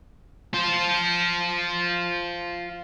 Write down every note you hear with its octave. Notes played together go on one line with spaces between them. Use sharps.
F4 C5